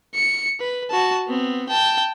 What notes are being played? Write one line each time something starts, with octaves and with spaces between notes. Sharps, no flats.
C#7
B4
F#4 A5
B3 C4
G5 A5